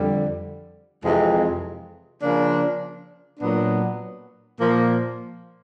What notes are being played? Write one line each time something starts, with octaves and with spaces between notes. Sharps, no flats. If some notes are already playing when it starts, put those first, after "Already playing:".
Already playing: F2 D3 G3
F2 C3 E3 G#3
C#3 F3 A#3 D4
A#2 F#3 B3 D4
A#2 F3 A#3